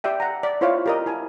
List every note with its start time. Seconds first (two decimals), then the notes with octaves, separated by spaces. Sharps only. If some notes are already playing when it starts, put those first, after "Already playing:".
0.04 G4 D5 E5 G5
0.20 F#5 A#5
0.43 D5
0.61 E4 F4 C5 C#5 E5 F5
0.86 G4 A#4 D#5
1.06 E4 G#5 A5